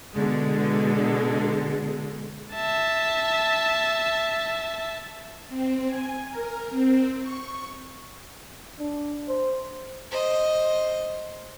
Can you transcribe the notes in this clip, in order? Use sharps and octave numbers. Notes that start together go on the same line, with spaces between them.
B2 D3 G#3
E5 A5
C4
G#5
A#4
C4
C#6
D4
C5
C5 D#5